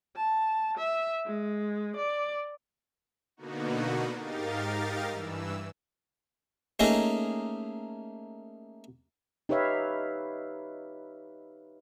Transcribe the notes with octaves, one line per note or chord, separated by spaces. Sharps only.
A5
E5
G#3
D5
B2 D3 A#3 B3 D#4 F#4
G#2 D#4 G4 A#4 F5 A6
G2 E3 E6
A3 A#3 C#4 D#4 G#4 D#5
D#4 G4 B4 C#5 E5 F5